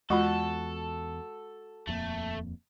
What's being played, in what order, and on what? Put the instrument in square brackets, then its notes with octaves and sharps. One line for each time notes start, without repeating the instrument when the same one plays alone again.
[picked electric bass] E2 [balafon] G#3 F4 [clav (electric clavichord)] F#4 F#5 [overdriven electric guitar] A4
[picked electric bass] D#1 F2 A#3 [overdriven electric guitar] A3